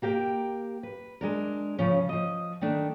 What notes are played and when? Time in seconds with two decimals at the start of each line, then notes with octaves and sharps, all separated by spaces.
0.02 A#3 G4 A#4 G5
0.83 B4
1.21 G#3 D4 A#4
1.79 C#3 F3 C#4
2.09 F3 D#5
2.61 D#3 A3 D4